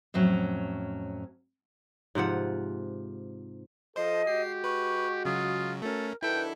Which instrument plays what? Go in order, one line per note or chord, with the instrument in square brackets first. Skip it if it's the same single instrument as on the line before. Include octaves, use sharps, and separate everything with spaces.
[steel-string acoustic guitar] F2 A2 F#3 C#4
[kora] G#2 C3 F3 F#5
[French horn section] F3 A4 [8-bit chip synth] C5 C6 [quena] D#5
[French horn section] G#3 F#4 [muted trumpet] G4 [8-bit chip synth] C7
[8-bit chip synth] B4 [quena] C#6
[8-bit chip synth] C#3 F#3 [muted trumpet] F4 [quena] D#6
[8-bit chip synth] A3 C#4 [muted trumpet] A4 [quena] A#4
[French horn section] D#3 F#3 D4 [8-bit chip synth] E4 A4 [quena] B4 [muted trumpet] G5